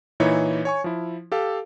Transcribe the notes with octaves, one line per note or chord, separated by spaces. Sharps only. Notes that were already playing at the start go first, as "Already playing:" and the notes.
A#2 E3 D#4 E4 C#5
C#5 G#5 C#6
F3 E4
G4 A4 F5